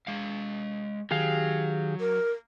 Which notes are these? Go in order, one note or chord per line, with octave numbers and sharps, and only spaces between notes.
G#3 F5
D#3 F#3 G4 G#4 F5
A#4